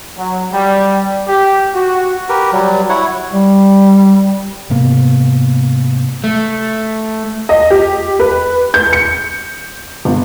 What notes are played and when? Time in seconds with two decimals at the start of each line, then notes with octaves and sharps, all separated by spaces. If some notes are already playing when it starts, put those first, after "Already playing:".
0.17 F#3
0.52 G3
1.27 G4
1.74 F#4
2.29 G4 A#4 B4
2.53 F#3 G3
2.89 E4 C#5 F#5
3.33 G3
4.70 G#2 C3 A#3 B3
6.24 A3
7.49 D#5
7.70 G4
8.20 B4
8.74 G6
8.93 C#7
10.05 G1